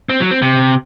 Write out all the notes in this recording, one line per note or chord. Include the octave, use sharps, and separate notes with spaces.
C4
F#3
C4
C3